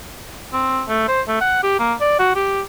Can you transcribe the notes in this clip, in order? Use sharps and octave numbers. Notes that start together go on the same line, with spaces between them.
C4
A3
C5
A3
F#5
G4
A#3
D5
F#4
G4